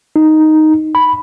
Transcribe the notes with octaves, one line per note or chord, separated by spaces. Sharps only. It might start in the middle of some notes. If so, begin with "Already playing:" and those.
D#4
B5